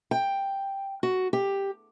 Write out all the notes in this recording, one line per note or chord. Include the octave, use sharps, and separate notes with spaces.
G5
F#4
G4